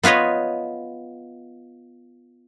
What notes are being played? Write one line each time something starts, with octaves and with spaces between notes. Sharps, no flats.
B3 F4 B4 C#5 D#5